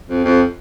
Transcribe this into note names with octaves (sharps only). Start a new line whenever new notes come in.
F2
F2